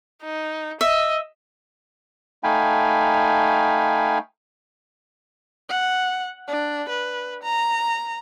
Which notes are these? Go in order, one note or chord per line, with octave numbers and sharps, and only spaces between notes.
D#4
D#5 E5
A3 D#4 F5 G5 G#5 B5
F#5
D4
B4
A#5